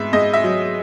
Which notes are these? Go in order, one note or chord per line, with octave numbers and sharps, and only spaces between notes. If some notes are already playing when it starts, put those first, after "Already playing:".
Already playing: G#2 B3 E5
G#2 D#5
E5
F#3